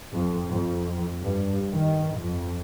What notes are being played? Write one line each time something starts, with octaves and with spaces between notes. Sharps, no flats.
F2
F2
G2
D#3
F2